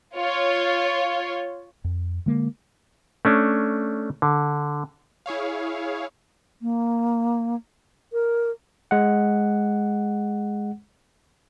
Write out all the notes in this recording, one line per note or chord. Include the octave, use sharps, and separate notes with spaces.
F4 C#5
F2
D3 G#3 A#3
A3 C#4 D4
D3
E4 G#4 C#5 F5
A#3
A#4
G#3 F#5